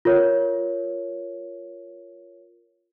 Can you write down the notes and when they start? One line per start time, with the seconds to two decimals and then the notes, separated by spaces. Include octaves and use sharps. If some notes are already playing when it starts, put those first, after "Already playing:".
0.05 F4 A#4 C#5